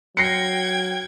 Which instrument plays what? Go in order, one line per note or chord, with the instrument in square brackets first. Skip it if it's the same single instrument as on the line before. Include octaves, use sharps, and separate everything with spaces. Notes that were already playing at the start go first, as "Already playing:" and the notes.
[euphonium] F#3 [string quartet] G5 G#6 [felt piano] A#6 C7 C#7